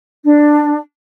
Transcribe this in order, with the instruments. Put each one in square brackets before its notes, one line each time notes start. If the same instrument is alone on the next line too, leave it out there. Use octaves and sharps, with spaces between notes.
[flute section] D4